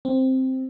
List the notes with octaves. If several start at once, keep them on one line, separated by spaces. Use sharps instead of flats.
C4